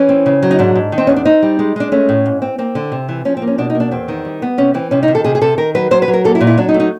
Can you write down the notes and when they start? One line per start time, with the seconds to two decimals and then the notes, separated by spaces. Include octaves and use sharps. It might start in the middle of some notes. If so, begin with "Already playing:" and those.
Already playing: E3 C#4
0.09 C4
0.26 C#3
0.42 F#3
0.51 D#4
0.59 G#2 D4
0.75 G#2
0.92 D#3
0.98 C4
1.07 E2 C#4
1.16 D4
1.25 C4 D#4
1.42 G3
1.59 G#3
1.76 G#3 D4
1.92 A3 C#4
2.09 A2
2.26 G#2
2.42 C4
2.58 A#3 C4
2.75 D3
2.92 C3
3.09 E3
3.25 F3 C#4
3.37 C4
3.42 A#3
3.47 C#4
3.58 B2 D4
3.70 D#4
3.75 A#3
3.80 D4
3.91 E2 C4
4.08 D#3
4.25 G3
4.42 B3
4.58 C3 C#4
4.74 E3 C4
4.91 C3 C#4
5.03 D#4
5.08 D#3
5.15 A4
5.24 C3 G#4
5.35 G#4
5.41 C3 A4
5.58 D#3 A#4
5.75 F#3 B4
5.91 F#3 C5
6.02 B4
6.08 F#3
6.13 A#4
6.24 A#3 A4
6.35 E4
6.41 A#2
6.47 E4
6.58 F#3 D4
6.69 D#4
6.74 A3
6.80 D#4